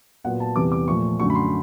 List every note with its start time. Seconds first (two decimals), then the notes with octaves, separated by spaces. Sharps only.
0.24 A#2 F#3 B3 F#5
0.40 A5
0.56 E2 C3 E3 G3 D6
0.72 D6
0.88 A#2 F3 A3 C#6
1.20 F#2 D3 F#3 A3 C#6
1.30 B5
1.35 C6